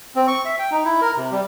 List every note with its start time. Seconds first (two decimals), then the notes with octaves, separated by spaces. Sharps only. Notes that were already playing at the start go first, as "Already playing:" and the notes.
0.16 C4
0.28 C#6
0.45 E5
0.59 G5
0.72 D#4
0.85 E4
1.01 A#4
1.17 C3
1.32 G3